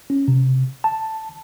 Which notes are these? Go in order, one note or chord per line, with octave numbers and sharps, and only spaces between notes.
C#4
C3
A5